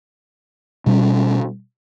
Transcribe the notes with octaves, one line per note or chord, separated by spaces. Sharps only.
B2 G3 C#4